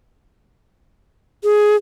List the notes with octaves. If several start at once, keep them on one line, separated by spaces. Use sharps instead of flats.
G#4